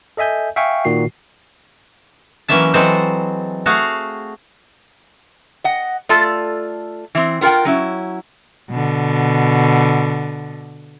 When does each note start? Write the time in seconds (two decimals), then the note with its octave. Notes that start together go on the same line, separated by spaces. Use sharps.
0.17 A4 D#5 E5 G#5 G6
0.56 E5 F5 G5 G#5 C#6
0.85 A#2 D#3 F#4 C7
2.48 E3 F#3 A#3 C#4 E5 A5
2.74 E3 F#3 G#3 C4 A4 C5
3.66 A3 F#4 G#4 F5
5.64 D#5 F#5
6.09 A3 F4 A4 D5 A5
7.15 E3 C4
7.41 B3 F4 A#4 F#5 G5
7.65 F#3 C#4 E4
8.70 B2 D3